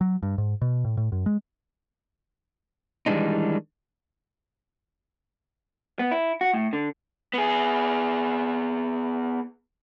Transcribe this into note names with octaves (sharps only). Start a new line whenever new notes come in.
F#3
G2
G#2
B2
A2
A2
F#2
G#3
D#3 E3 G3 G#3 D4 D#4
B3
E4
F#4
A2
D3
B3 G#4